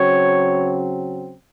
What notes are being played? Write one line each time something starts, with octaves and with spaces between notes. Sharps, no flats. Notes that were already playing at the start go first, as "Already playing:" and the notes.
Already playing: C#3 F#3 C4 C#5